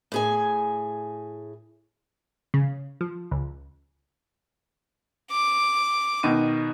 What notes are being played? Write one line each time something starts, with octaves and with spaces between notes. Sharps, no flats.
A2 G#4 G#5
C#3
F3
C#2
D6
B2 D#3 D#7